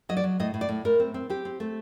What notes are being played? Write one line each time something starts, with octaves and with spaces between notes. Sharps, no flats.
F#3 D#5
D5
F#3
A2 D#5
A2
D5
A2
A2 A#4
C4
C4
C4 G4
C4
A3